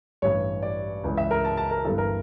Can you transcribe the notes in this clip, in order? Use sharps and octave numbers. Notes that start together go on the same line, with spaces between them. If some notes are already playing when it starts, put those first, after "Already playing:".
A1 G2 E3 C#5
D5
C#2 C#3 E3
E5
A#4
A5
A5
A#4
G1 G2 E3 A4
A#4